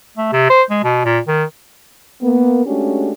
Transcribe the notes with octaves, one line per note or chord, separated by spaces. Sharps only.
A3
C3
C5
G#3
B2
A#2
D#3
A#3 B3
G#3 A3 C#4 D4 F#4 G4